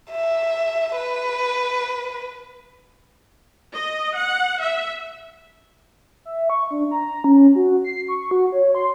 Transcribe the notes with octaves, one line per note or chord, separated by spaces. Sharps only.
E5
B4
D#5
F#5
E5
E5
C#6
D4
A#5
C#4
F#4
C7
C#6
F#4
C#5
C6